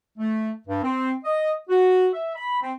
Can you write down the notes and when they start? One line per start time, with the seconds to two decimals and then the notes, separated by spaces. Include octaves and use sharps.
0.18 A3
0.68 G2
0.83 C4
1.24 D#5
1.69 F#4
2.14 E5
2.36 B5
2.62 C4